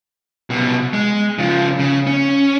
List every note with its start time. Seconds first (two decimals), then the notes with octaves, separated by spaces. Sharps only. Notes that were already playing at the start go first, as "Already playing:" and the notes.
0.50 C2 B2
0.93 G#3
1.38 C#3 F3
1.79 C#3
2.07 C#4